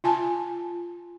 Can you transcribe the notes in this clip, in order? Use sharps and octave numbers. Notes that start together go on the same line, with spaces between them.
F4 G#5 A5